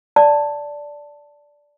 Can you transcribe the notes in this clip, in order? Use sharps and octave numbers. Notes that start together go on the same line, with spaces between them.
D5 A5